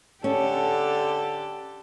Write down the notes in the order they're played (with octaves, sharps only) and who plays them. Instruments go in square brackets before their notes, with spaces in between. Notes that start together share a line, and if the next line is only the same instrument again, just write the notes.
[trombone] D3 [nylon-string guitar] C#4 [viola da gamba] G4 [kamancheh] A4